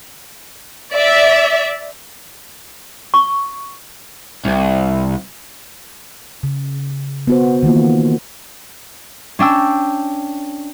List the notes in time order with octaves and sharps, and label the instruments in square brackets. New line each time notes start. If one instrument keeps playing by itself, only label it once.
[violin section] D5 E5
[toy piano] C#6
[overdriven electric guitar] C2
[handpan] C#3
B3 F#4 C5
D#3 E3 A#3 F4
[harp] C#4 D4 G5 E6